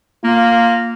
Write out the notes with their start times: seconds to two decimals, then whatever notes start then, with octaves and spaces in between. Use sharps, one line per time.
0.24 A#3 F4